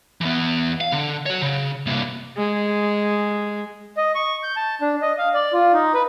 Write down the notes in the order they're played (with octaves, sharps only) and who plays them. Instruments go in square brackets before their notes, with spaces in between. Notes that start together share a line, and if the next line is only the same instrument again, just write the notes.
[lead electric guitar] E3 B3
F5
D3
F#4 C#5
C#3
C2 A#3
[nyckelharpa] G#3
[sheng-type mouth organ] D#5
C#6
G6
A5
D4
D#5
F5
D5
F4
D#4
B4